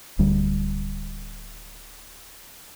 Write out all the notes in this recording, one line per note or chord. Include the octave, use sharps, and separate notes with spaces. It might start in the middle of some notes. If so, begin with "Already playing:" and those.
D1 D2 G3